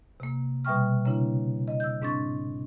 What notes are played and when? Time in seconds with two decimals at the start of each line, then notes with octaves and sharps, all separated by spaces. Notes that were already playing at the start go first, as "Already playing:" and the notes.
0.20 C3 A#3
0.65 B2 G3 E5 G5 C#6 F6
1.05 C#3 A#3 D4 E4
1.68 D#5
1.80 E6 G6
2.02 G#2 C4 D4 C#6 A6